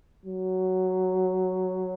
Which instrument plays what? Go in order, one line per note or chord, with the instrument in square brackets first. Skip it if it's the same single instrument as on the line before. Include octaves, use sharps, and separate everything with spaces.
[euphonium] F#3